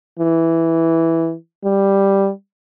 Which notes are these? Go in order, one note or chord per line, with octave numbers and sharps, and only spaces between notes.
E3
G3